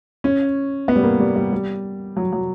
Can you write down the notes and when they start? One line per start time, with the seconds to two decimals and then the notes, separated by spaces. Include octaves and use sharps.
0.24 C#4
0.88 B3
0.96 G3
1.04 A#3
1.20 G3
1.36 G3
1.52 G3
2.17 F#3
2.33 F#3